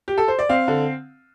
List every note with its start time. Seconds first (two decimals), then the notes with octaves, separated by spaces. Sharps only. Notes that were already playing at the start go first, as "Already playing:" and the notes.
0.08 G4
0.18 A4
0.28 C5
0.39 D5
0.49 C4 F5
0.68 D3